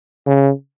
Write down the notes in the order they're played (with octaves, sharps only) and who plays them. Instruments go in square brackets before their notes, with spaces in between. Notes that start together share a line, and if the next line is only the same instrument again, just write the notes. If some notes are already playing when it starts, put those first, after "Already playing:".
[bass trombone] C#3